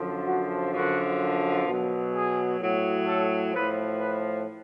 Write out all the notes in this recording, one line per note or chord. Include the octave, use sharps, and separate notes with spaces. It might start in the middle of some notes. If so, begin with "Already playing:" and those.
Already playing: F#2 D3 F3
F#4
F#2 D3 F3 F#4
B2 F#3
G#4
A2 F#3
A4
A2 F3 B4
B4